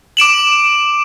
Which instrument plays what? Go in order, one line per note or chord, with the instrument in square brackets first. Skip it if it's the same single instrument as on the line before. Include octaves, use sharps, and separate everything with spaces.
[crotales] D6 D7 E7 F#7